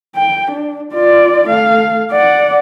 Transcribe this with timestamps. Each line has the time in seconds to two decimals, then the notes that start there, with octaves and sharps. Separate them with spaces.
0.16 G5
0.51 D4
0.92 F4 D5
1.48 A3 F5
2.11 D5 F#5